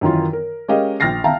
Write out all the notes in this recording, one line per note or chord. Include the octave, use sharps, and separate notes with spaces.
F#2 D#3 E3 F4
A#4
G#3 C#4 G4 A#4 D#5 F5
A#1 G5 F6 A6 A#6 C7
E5 F5 G5 A5 A#5